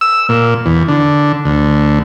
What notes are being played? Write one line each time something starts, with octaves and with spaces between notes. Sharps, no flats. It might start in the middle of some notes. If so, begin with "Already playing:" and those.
E6
A#2
E2
D3
D2